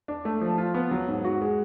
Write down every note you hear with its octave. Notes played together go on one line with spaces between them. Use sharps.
D4
A3
F3
F4
B3
F#3
G#2
F#4
G#3